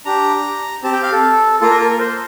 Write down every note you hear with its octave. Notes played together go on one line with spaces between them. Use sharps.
D4 G4 A#5
C4 G4 A5
G5
F5
A4
A#3 F4 A4
A#4
A4
A#4
C5